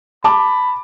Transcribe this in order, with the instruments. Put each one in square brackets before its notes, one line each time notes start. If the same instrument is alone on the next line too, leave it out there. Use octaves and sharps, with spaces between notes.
[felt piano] A5 D6 [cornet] B5